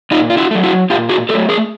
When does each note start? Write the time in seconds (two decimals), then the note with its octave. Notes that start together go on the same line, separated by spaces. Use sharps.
0.11 A#2 D#4 F4
0.30 F4
0.37 E4 F#4
0.51 F#3 A3
0.63 E4 F#4
0.90 A#2 F4 G4
1.09 F#4 G#4
1.29 F#3 A3 G4 A4
1.49 G#4 A#4